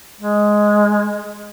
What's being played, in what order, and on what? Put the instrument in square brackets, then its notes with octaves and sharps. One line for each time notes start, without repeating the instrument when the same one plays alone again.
[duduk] G#3